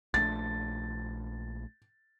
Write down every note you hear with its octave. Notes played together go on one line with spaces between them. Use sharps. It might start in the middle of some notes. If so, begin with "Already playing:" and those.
A#1 A3 D4 A6